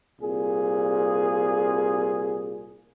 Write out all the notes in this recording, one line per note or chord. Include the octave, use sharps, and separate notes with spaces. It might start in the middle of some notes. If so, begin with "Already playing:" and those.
C2 A#2 G#4